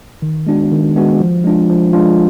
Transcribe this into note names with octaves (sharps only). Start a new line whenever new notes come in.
D#3
G#3 B3 D4 F#4
D#3
G#3 B3 D4 F#4
F3
G#3 D4 F4
F3
G#3 D4 F4